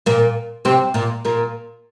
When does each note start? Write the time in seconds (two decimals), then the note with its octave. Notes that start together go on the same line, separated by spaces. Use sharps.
0.06 A#2 A#3
0.65 C3 C4
0.94 A#2 A#3
1.25 A#2 A#3